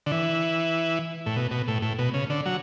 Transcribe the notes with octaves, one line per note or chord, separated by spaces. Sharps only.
D3
E3
A2
B2
B2
A2
A2
B2
C#3
D3
F#3